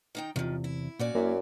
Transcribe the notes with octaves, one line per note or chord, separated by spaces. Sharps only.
D#3 D#4 G5
E2 C3 D#3 F3
E4
A#2 C#4 F#4 D5
F#2 A#3 E4